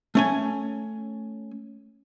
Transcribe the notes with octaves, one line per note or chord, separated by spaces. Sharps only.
A3 C#4 G#5